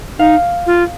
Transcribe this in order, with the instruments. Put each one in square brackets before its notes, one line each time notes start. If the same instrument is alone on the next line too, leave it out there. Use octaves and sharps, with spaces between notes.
[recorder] D#4 [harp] F5
[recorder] F4